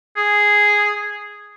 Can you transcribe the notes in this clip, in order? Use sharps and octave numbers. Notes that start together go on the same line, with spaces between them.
G#4